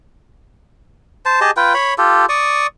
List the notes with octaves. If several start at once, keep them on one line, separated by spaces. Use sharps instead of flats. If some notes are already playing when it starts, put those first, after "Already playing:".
C5 A5
G4 G#4 D#5 A5
F4 B4 G5
C#5 B5
F4 G4 A4
D5 C#6 D#6